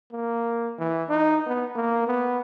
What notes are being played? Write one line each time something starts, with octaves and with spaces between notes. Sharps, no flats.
A#3
E3
D#4
B3
A#3
B3